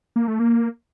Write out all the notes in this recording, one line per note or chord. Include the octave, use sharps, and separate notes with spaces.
A#3
A3
A#3